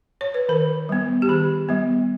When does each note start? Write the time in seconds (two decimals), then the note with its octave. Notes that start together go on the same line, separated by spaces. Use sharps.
0.21 C#5
0.34 B4
0.49 D#3 A#4
0.89 G3 B3
1.22 G4
1.29 D#3 G#4
1.69 G3 B3